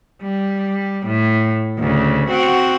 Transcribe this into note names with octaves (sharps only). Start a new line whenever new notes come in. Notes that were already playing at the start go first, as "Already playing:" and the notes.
G3
A2
D2 C#3
C4 F#4